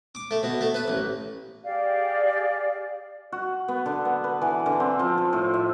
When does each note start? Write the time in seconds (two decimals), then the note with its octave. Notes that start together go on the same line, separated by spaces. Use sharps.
0.15 D6
0.31 A3
0.43 B2
0.61 A3
0.74 B4
0.88 A1
1.63 G4 G#4 D5 F5
3.32 F#4
3.68 B3
3.86 D3
4.05 B3
4.24 B4
4.42 E3
4.66 D3
4.80 C4
4.99 F3
5.18 F3
5.33 A2
5.54 E5